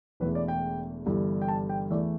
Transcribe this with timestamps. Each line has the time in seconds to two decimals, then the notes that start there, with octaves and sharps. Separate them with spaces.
0.20 E1 E2 E3 A3 B4
0.35 D5
0.48 G5
1.06 G1 G2 E3 G3
1.42 G5
1.48 A5
1.69 G5
1.90 E2 E3 A3 D5